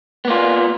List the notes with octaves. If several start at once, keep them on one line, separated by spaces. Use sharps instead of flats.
A#3 B3 F4